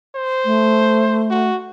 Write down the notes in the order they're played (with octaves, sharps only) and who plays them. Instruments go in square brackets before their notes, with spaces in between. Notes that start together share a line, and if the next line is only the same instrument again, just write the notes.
[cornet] C5
[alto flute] A3
[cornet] F#4